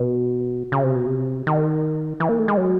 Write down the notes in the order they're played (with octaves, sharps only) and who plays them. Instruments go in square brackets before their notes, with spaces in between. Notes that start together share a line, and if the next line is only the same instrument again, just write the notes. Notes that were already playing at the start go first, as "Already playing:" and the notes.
Already playing: [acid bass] B2
C#3
C3
B2
C3
D#3
E3
A#3
A3
G#3
F#3